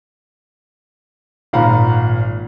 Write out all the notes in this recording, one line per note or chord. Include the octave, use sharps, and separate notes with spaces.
G#1 A#2 F5 F#5 A#5 B5